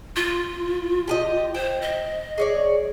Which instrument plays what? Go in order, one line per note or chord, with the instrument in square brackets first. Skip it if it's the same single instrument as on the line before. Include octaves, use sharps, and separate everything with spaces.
[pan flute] F4
[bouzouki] G4 G#4 D#5
[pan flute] C5 [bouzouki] G5
[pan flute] D#5
[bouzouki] G#4 C#5 D5